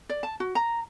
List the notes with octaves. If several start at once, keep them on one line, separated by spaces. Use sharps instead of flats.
D5
A5
F#4
A#5